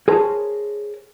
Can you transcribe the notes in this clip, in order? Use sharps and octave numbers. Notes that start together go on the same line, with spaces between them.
G#4 A#4 C5 C#5 A5